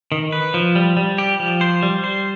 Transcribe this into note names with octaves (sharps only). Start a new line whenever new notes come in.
D#3
B4
F3
G3
G3
G4
F3
C5
G3
C5